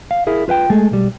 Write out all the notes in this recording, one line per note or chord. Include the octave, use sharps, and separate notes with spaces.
F5
E4 G#4 A#4
F4 B4 F5 G5
G#3 A3 G#4 A4
B1 G3